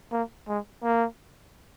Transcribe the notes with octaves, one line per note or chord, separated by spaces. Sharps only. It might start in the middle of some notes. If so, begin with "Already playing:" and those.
A#3
G#3
A#3